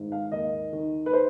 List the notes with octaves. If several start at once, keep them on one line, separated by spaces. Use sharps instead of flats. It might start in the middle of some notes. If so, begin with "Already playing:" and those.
Already playing: G#1 G#2
F5
D#2 D#5
D#3
B4
C5